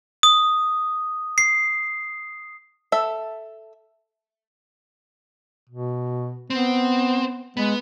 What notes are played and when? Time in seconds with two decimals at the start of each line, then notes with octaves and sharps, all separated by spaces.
0.23 D#6
1.38 C7
2.92 A4 E5
5.70 B2
6.50 B3 C4
7.57 G#3 B3